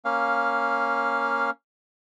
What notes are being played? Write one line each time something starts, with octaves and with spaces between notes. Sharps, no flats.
A#3 C#4 F5